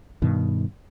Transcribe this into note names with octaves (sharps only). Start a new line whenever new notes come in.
G2 B2 D#3